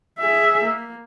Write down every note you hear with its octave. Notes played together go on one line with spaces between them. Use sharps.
G#4 E5
A#3